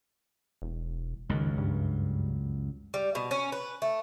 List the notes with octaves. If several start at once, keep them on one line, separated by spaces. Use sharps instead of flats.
E1
C#2 F#2 D#3
G2
G3
B2
C#4
B4
A3